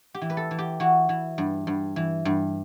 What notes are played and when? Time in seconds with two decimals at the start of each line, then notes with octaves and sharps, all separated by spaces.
0.14 G4
0.21 E3
0.30 B4
0.37 A4
0.51 E3
0.58 G4
0.80 E3 F#4
1.09 E3
1.38 G2
1.67 G2
1.96 E3
2.25 G2